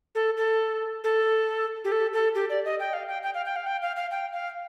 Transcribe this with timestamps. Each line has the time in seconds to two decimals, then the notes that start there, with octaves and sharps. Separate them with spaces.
0.15 A4
0.37 A4
1.04 A4
1.84 G4
1.92 A4
2.13 A4
2.35 G4
2.49 D5
2.65 D#5
2.80 G5
2.93 F5
3.08 G5
3.23 G5
3.34 F5
3.45 G5
3.56 F5
3.67 G5
3.82 F5
3.96 F5
4.11 G5
4.32 F5